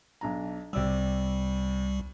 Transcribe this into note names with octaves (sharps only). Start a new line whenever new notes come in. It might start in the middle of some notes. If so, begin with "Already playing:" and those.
B1 D4 A#5
C2 C3 G3 D5 E6